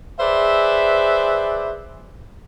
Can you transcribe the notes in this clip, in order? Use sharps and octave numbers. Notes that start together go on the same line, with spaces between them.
G#4 B4 C5 D5 E5